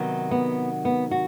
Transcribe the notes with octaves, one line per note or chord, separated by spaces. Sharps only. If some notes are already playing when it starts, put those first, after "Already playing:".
Already playing: C3 D#3 F#3 B3
B3
B3
F#4